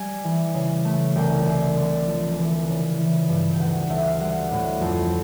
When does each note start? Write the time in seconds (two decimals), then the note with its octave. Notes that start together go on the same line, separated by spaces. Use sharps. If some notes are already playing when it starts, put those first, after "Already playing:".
Already playing: G3 G#5
0.24 E3
0.54 C#3
0.85 A3
1.15 C2 G5
1.46 C2
1.77 D3
2.07 F3
2.38 E3
2.68 C#3
2.99 E3
3.29 G2
3.53 G5
3.59 D2 F#5
3.90 D2 E5
4.06 F5
4.20 G3 F#5
4.51 A2
4.81 F2